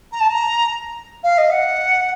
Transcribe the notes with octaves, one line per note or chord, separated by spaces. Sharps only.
A#5
A5
A#5
F5
D#5
F#5